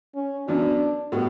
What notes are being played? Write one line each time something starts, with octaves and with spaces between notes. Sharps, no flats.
C#4
F#2 E3 B3 D4 F#4
A2 G3 B3 F#4